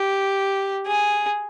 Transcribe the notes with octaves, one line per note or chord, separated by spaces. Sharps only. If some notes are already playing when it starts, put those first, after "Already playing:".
Already playing: G4
G#4